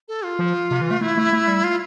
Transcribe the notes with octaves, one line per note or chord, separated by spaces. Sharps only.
A4
F4
F3
C3
E3
A3
A3 E4
A3
A3
G3
F4